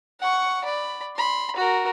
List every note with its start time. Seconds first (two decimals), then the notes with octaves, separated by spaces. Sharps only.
0.20 F#5 C#6
0.64 D5 B5
1.16 B5 C6
1.56 F#4 A#4